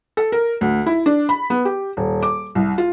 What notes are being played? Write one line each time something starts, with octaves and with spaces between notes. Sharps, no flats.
A4
A#4
D2
E4
D4
B5
B3
G4
D#1
D6
C2
F4